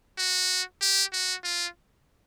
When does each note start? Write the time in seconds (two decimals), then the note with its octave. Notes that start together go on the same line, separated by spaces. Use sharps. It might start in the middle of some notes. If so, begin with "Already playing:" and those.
0.18 F#4
0.81 G4
1.13 F#4
1.44 F4